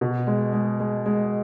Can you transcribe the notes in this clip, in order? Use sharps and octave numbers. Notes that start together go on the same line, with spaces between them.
B2
G#3
G#3
G#3
G#3